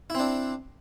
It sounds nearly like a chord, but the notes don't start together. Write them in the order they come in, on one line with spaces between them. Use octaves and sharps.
E4 C4 D4